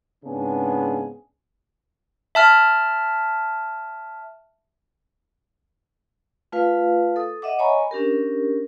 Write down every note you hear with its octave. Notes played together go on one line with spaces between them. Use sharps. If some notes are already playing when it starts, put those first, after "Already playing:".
G#2 C#3 B3 C4 D4 G#4
E5 A5 F6
A3 F4 B4 F5
A4 D#6
D#5 E5 F#5 D6
C#5 D#5 G#5 A#5 B5 C#6
C#4 D4 G4 A#4